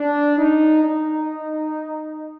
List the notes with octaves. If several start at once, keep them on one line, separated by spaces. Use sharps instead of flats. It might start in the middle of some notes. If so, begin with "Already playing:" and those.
Already playing: D4
D#4
D#4